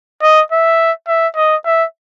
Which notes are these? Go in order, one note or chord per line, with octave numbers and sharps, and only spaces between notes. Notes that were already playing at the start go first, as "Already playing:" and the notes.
D#5
E5
E5
D#5
E5